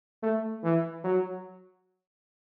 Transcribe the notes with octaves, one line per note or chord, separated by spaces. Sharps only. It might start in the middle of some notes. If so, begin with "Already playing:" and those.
A3
E3
F#3